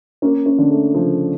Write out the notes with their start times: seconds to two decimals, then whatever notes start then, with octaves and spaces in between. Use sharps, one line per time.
0.22 A#3 C#4
0.46 C#4
0.58 D3
0.71 A3
0.94 C#3 F3